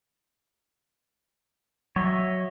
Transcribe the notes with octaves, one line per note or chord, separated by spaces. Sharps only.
F#3 C#5 D#5 E5